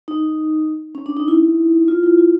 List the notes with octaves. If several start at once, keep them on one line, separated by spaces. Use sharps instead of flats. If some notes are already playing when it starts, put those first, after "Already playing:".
D#4
C#4
D4
D#4
E4
F4
E4
F4